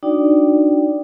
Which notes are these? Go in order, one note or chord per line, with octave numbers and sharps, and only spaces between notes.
D4 D#4 F#4 D5 G5